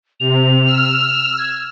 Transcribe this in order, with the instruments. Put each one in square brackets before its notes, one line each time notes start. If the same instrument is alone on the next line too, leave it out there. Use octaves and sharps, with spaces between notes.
[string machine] C3 [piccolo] F7
[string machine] E6 F6
[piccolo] G#6